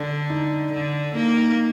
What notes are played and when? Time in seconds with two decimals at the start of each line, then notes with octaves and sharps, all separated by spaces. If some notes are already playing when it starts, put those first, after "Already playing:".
Already playing: D3 D4
0.30 D#4
0.73 D3
1.16 A#3 D#4
1.37 D#4